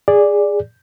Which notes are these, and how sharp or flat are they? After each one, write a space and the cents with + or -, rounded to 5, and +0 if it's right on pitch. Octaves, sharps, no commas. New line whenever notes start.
G#4 -15 D5 +0